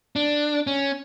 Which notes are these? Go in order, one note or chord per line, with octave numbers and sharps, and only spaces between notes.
D4
C#4